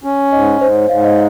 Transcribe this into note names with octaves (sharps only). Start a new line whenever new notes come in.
C#4
G#2 D#5
G#2 C5
C#5
G#2 F5
D#5